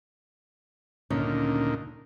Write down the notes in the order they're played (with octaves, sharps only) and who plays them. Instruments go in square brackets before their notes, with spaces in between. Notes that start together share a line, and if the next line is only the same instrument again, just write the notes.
[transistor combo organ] D2 A#2 D#3 [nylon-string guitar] C#4